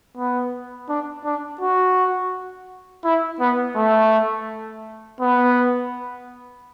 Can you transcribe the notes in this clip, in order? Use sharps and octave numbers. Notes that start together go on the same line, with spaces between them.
B3
D4
D4
F#4
E4
B3
A3
B3